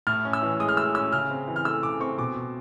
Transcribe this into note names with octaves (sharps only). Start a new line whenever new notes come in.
A2 F6
C#4
E6
E3
G#3 D#6
F6
A2 E6
C#4 E6
C#3 F6
C4
E3
F6
A3 E6
C#3 D6
C4 C#6
B2 D6
B2